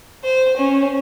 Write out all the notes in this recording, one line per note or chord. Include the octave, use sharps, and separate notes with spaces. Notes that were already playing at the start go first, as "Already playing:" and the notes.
C5
C#4